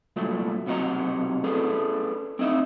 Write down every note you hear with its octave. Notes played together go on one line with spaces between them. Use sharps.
C2 A#2 F#3 A3
B1 C3 F#4 A#4 D#5 A#5
C#4 G#4 A4 B4
C4 D#4 D#5 E5